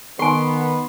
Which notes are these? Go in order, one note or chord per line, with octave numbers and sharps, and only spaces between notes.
D#3 B3 G4 G#5 C6